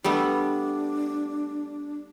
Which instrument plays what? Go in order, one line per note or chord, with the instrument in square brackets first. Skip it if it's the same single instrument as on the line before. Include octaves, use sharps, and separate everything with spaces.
[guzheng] G3 A3 B3 [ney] D4